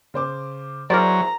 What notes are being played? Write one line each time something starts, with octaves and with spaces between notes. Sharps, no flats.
C#3 C5 D6
F#3 E4 G#4 A#4 C5 D5 A#5